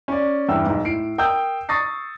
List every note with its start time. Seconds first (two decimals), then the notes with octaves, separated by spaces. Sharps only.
0.08 C#4 D5
0.48 E2 G2 E4 G5 E6
0.66 B1 G#2
0.85 A2 C7 D7
1.18 A#4 G5 D#6 E6 G6
1.69 C#6 D#6 A6 A#6 C7